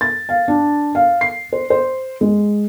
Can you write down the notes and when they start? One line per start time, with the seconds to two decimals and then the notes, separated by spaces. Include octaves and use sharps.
0.01 A6
0.29 F5
0.48 D4
0.95 F5
1.21 C7
1.53 C5
1.70 C5
2.21 G#3